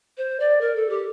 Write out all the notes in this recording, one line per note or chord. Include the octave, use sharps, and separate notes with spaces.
C5
D5
A#4
A4
G4